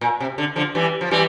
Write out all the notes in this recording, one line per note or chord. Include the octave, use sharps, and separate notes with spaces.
A#2
C3
D3
D3 F3
E3 G3
F3
E3 G3